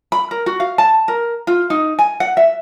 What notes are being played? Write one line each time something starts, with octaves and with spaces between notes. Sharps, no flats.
B5
A#4
F#4
F5
A5
A#4
F4
D#4
G#5
F#5
E5